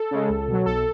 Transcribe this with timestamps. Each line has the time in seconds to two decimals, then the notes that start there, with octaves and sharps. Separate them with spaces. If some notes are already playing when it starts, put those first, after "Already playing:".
Already playing: A4
0.11 C#3 G#3
0.29 C#2
0.48 B2 F#3
0.66 B1 A4